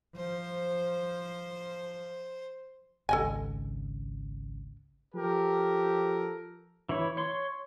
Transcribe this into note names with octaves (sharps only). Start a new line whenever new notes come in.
F3 C5
G#1 C#2 A4 D#5 G#5
F3 G4 A4 A#4
E3 E4 C#5
C#5 C6